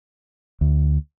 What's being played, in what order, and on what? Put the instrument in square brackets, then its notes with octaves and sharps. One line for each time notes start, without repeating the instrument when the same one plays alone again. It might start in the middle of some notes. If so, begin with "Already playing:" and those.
[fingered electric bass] D2